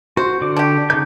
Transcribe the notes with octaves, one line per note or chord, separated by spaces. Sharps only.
F#4 C5
D3 D6
D4 G4
C#3 D#4 G6